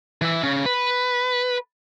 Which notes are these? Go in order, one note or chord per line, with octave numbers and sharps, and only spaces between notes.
E3 E5
C#3
B4